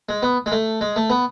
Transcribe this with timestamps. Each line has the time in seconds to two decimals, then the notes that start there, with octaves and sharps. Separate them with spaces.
0.09 G#3
0.23 B3
0.46 G#3
0.52 A3
0.81 G#3
0.96 A3
1.10 B3